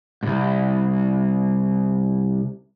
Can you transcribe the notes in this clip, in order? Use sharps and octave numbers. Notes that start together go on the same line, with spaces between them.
C2 G#2